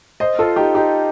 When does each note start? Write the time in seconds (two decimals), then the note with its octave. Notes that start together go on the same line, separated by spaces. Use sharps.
0.20 C5 D#5
0.39 F4 A4
0.56 D#4 G4
0.75 D#4 G4